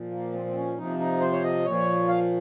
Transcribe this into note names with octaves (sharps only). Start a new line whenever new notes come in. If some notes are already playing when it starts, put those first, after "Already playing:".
Already playing: A#2 F3
A#3
C4
C4
C#4
C3 F3 D#4
D#4
C5
C#5
D#5
A#2 F3 C#5
F5